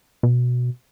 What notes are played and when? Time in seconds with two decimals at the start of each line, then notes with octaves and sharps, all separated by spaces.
0.23 B2